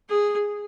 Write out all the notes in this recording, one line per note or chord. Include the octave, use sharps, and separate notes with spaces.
G#4